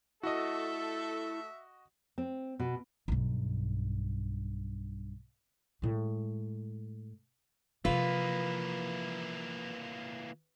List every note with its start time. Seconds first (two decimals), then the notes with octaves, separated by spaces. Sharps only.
0.23 A3 E4 F#4 A4 D#5 E5
2.18 C4
2.59 B2
3.08 B1 G2
5.82 A2 G#3
7.85 C3 E3 F3 A#3 F4 B4